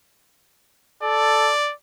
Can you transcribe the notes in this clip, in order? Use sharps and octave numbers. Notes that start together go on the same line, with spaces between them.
A4 D5